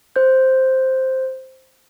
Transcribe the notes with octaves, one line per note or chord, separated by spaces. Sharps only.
C5 G6